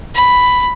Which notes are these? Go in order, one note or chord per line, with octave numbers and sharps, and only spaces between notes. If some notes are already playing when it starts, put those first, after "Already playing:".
B5